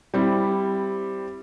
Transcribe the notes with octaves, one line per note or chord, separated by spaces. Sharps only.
G3 C4 E4